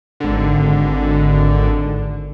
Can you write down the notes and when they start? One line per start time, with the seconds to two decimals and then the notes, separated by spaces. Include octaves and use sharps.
0.20 G#1 D3